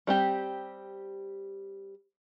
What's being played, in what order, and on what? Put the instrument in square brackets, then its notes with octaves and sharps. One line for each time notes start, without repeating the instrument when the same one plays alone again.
[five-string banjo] G3 C4 G4